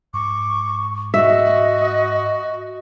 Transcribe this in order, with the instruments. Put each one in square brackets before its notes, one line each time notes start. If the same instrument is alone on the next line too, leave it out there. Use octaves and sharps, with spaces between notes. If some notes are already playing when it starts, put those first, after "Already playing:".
[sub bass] G#2 [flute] C#6 [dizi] D6
[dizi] F#4 [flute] D#5 [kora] E5